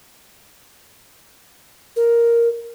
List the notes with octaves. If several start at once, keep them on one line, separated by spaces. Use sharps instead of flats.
A#4